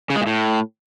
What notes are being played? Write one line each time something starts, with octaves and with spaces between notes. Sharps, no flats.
C#3
G#3
A#2
A2